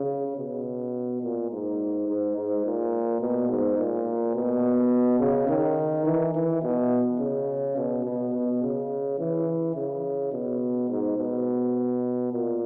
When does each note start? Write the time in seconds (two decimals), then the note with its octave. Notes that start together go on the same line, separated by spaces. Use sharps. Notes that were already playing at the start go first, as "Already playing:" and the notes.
Already playing: C#3
0.37 B2
1.22 A#2
1.51 G#2
2.07 G#2
2.36 G#2
2.65 A#2
3.21 B2
3.49 G#2
3.78 A#2
4.35 B2
5.20 C#3
5.49 D#3
6.06 E3
6.34 E3
6.63 B2
7.20 C#3
7.77 B2
8.05 B2
8.34 B2
8.62 C#3
9.19 E3
9.75 C#3
10.32 B2
10.89 G#2
11.18 B2
12.32 A#2